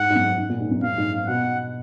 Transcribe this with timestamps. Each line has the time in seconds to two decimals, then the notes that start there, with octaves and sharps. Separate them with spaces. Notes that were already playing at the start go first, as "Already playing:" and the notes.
Already playing: G#2 F#5
0.10 G#2
0.15 F#2
0.37 G#2
0.49 A#2
0.60 G#2
0.71 F#2
0.82 F#2 F5
0.98 G#2
1.27 B2 F#5